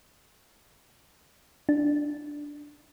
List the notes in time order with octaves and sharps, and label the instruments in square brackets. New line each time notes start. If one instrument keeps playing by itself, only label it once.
[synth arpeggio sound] D4